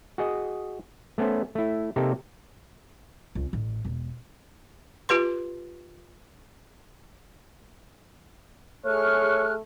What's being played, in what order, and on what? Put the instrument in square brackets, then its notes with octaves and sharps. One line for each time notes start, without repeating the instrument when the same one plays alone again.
[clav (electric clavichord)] F#4 G#4 D#5
A3 B3 C#4 A4 C5
A3 E4
C3 A#3 D#4 G4 A4
[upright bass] C#2
A1
E1
[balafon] F4 G4 B4 C6
[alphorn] A3 [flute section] G#4 F6 F#6 [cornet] C#5